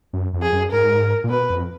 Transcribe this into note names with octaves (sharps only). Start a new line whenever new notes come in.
F#2
F2
G#4
F#2
G#2 A#4
A#2
B2 B4
F2